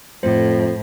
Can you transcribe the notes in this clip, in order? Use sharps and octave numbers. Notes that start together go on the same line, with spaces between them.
F2 A2 C5